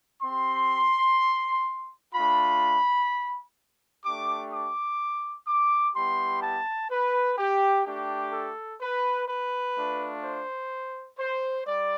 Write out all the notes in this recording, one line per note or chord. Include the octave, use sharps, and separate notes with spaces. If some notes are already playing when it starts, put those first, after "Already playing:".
C4 G4 C6
A3 D4 F4 B5
A3 D4 G4 D6
D6
D6
G3 B3 E4 G4 C6
A5
B4
G4
A3 D4 G4
A4
B4
B4
A3 D4 F4
C5
C5
G3 D5